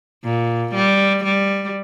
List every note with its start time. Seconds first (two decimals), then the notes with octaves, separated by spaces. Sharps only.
0.24 A#2
0.74 G3
1.24 G3